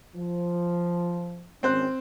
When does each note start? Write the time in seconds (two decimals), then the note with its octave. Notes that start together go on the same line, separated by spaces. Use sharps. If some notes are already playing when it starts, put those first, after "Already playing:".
0.16 F3
1.63 G#1 D#3 C4 C#4 C5 F#6